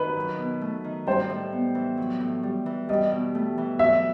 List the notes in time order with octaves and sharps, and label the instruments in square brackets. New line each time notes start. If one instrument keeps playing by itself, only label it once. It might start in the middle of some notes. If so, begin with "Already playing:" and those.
Already playing: [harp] D#3 [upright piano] B4
[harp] F#3
B2
A3
D#3
[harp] G3 [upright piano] C5
[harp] A2
B3
E3
F#3
A2
G3
E3
[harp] G3 [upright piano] D#5
[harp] B2
A3
E3
[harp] F#3 [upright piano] E5